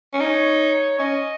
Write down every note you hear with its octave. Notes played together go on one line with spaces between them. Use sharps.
C#4
D#4 C#5
C#4 D#5